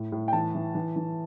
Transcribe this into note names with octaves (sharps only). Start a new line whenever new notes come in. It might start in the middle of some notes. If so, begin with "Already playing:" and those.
Already playing: A2
A2
G5
E3 A5
E3
E3
E3